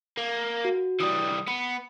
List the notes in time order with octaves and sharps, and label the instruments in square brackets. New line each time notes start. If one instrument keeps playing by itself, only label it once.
[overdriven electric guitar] A#3
[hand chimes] F#4
[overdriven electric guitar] E3 G3 [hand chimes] D#6
[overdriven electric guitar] B3 [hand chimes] C#7